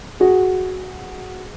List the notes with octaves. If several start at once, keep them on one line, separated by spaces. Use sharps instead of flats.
F#4 G#4